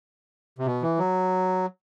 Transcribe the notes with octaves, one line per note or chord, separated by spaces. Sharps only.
C3
B2
E3
F#3